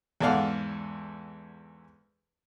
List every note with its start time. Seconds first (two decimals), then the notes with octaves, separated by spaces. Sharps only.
0.21 E2 G#2 A4 D5 F5 F#5